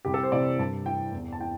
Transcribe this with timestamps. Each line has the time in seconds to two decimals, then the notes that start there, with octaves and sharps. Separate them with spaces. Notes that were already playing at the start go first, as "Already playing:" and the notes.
0.05 C2 G4
0.14 A4
0.23 C5
0.32 C3 E3 D5
0.58 G2 A5
0.86 E3 G5
1.12 E2
1.33 A5
1.40 E3 G5